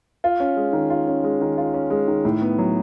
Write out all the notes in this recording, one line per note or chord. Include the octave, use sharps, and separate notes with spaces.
F4
C#4
G#3
D#3
F4
C#4
G#3
D#3
F4
C#4
G#3
D#3
A2
B3
F#3